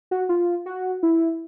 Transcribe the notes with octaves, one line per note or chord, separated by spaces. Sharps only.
F#4
F4
F#4
E4